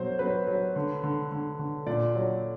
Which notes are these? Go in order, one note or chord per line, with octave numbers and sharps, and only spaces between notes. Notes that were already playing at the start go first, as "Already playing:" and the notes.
Already playing: B2 F#3 C5
F#3 B4
F#3
D3
D3
D3
D3
A#2 D5
F#3